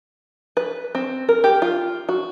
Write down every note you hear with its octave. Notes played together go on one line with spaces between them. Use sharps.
B4
C4
A#4
G4
F4
F#4